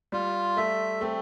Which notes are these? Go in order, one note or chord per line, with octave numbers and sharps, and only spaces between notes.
G3 F4
A3 E5
A3 C4